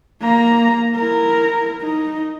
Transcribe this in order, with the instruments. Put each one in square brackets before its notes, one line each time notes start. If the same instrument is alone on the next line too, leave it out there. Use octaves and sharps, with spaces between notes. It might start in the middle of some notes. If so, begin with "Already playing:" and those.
[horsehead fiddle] A#3 A#5
E4 A#4
D#4